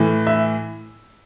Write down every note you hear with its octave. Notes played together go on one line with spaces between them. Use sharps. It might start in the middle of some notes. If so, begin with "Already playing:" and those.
Already playing: A2 E3
E5